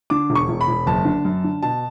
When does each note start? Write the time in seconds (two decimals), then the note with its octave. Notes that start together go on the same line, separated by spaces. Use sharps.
0.10 D3 D6
0.30 E1
0.35 C#6
0.49 E1
0.61 B5
0.68 E1
0.87 F#1 A5
1.05 D3
1.25 F#2
1.44 D3
1.63 B2 A5